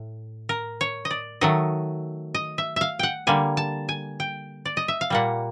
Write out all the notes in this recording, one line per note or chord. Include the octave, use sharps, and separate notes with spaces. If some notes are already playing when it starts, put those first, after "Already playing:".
Already playing: A2
A#4
C#5
D#5
D5
D#3 F#3 A3 D#5
D#5
E5
E5 F5
F#5 G5
D3 G3 A#3 G#5
A5
G#5
G5
D5
D#5
E5
F5
A#2 G3 A#3 F#5